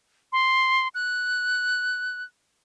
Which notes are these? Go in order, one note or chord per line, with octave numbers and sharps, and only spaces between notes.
C6
F#6